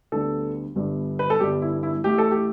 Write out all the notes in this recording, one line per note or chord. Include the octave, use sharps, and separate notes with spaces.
D2 D3 G3 B3 A4
G1 G2 G3 B3
B4
A4
G1 G2 G3 B3 G4
E4
E4
A1 A2 A3 G4
A4
G4